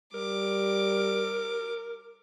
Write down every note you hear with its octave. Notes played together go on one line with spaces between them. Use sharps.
G3 A#4 D6